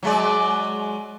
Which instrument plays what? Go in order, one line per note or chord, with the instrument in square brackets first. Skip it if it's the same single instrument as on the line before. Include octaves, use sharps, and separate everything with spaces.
[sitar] F#3 G#3 D5